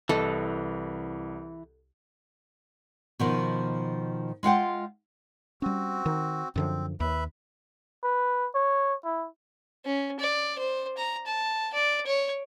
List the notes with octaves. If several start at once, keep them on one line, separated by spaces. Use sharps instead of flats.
C2 E3 A4 D#5
B2 D#3 F3
G#3 F4 F#5 G5
G3 C4 C#4 F#4
D#3
F#2 D3 F3 C4
D#2 B4 E5 B5
B4
C#5
E4
C#4
D5
C5
A#5
A5
D5
C#5